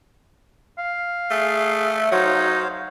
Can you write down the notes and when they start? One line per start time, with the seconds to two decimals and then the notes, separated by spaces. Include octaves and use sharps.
0.79 F5
1.31 A3 G#4
2.12 F#3 D#4 C5 C#5 F5